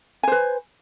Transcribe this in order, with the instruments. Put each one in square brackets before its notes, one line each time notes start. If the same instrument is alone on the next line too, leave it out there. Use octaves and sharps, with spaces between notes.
[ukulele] G#5
C5
B4